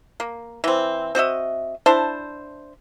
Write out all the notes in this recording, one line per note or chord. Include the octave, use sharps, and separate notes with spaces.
A#3
E3 C4
C4 F#4 D#5 E5
D4 E4 C5 A5